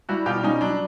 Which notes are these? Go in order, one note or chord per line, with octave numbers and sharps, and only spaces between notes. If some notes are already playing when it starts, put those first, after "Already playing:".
G3 E4 F#4
B2 F4 G4
G3 C#4 D#4
F#3 D4